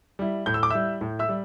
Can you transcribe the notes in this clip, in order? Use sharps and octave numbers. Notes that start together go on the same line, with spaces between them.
G3 E4
A2 G6
E6
D6
G3 E4 E5 E6
A2
E5 E6
G3